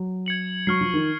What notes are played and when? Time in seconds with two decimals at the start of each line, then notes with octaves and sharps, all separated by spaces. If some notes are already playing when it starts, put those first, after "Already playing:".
Already playing: F#3
0.26 G#6 C#7 F#7
0.67 F#3 C#6 F6 C7
0.81 F3
0.94 D#3